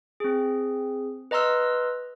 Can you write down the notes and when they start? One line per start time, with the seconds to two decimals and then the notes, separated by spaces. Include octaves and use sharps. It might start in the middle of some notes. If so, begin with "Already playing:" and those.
0.20 C4 G#4
1.31 B4 D#5 A#5 C6 E6 F6